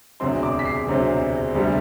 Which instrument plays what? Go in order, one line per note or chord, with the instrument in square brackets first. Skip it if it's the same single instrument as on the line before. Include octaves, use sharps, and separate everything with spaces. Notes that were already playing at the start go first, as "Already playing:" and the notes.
[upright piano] E1 D2 C3 F#3 C4 C6
D6
B6
C7
E1 D2 C3 F#3 C4
E1 D2 C3 G3